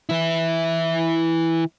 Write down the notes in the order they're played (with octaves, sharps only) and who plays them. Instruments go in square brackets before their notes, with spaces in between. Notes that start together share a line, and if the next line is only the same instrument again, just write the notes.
[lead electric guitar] E3 E4